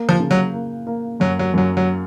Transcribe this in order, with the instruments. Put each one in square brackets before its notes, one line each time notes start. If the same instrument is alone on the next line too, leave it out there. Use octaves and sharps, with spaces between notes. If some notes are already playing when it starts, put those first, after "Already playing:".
Already playing: [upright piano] A#3
[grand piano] F3
[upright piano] C#3
[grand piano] F#3
[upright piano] A#3
A#3
[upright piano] F#2 [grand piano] F#3
[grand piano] F#3
[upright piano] F#2 [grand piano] F#3
[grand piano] F#3